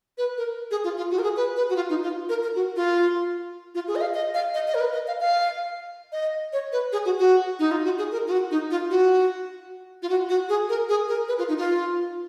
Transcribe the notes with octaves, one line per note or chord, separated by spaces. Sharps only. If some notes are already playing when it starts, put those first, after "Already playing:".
B4
A#4
G#4
F4
F4
F#4
A#4
G#4
B4
B4
F#4
F4
D#4
F4
A#4
A#4
F#4
F4
F4
G#4
D#5
F5
D#5
F5
D#5
D#5
A#4
B4
D#5
F5
F5
D#5
C#5
B4
G#4
F#4
F#4
D#4
F4
F#4
G#4
A#4
F4
F#4
D#4
F4
F#4
F4
F#4
F#4
G#4
A#4
G#4
A#4
B4
F4
D#4
F4